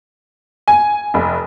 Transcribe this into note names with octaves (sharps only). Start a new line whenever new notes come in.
G#5
F1